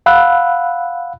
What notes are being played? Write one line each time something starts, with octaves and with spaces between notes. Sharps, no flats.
F5 F#5 B5 E6 F#6